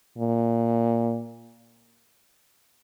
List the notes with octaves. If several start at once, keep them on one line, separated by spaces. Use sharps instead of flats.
A#2